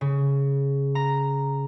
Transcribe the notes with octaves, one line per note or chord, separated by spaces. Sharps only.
C#3
A#5